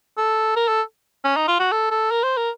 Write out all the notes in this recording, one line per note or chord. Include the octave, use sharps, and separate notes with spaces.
A4
A#4
A4
C#4
D#4
F4
F#4
A4
A4
A#4
C5
A#4